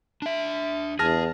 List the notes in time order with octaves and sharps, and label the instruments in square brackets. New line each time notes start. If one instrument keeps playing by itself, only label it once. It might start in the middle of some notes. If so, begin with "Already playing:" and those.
[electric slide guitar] D4 E5
[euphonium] E2 [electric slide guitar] G#4 [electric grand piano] A5 F6 A#6